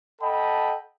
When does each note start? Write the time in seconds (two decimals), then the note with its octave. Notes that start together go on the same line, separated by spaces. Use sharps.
0.22 A4 D#5 F#5 G5 A5 B5